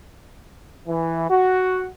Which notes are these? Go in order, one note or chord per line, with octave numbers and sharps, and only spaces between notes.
E3
F#4